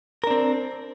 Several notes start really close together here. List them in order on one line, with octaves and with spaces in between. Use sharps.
A#4 D4 C4